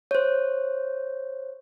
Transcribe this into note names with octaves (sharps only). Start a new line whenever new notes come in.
C5 C#5